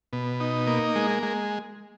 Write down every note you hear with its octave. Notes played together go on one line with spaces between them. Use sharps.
B2
D#4
A#3
G#3
G#3